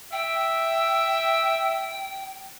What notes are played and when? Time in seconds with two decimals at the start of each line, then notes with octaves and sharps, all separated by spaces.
0.12 E5 G5